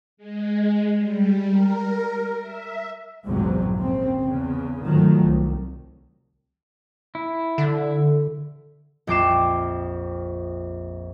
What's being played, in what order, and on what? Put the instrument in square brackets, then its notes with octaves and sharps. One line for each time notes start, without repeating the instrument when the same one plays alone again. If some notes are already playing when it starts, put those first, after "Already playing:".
[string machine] G#3
G3
A#4
E5
[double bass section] A#1 E2 G#2 C3 F#3
D#2 C#3 C4
E2 C#3
G#2 D#3 F3 F#3 A3
C2
[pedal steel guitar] E4
[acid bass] D3
[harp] A#1 F2 G5 D6 C7 E7